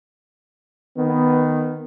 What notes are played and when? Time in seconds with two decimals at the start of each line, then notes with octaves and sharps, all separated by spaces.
0.97 D#3 B3